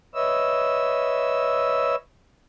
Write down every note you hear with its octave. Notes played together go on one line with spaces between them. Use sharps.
B4 C#5 D#5 E5 E6